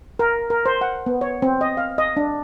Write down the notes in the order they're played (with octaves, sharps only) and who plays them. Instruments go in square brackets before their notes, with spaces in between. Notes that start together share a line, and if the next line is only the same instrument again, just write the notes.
[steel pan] A#4
A#4
C5
F#5
B3
C#5
C4
D#5
F5
D#5
D4